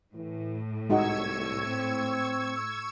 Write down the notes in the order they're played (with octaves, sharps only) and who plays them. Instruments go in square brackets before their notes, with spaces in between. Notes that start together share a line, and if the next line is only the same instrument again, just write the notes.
[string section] A2 [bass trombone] E3
[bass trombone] C2 [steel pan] G#3 D#4 F#4 [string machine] C#6 E6 G#6
[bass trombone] C4